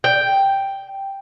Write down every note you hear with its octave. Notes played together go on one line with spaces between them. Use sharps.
G5